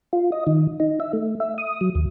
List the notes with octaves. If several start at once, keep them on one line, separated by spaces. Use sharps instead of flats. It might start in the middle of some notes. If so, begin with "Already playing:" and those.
F4
D#5
D#3
D#4
E5
A3
E5
D#6
F#3
D#2